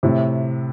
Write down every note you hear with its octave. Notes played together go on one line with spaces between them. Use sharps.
A2 C3